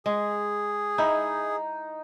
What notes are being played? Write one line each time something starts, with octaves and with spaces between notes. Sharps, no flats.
G#3 G#4
D#4 E4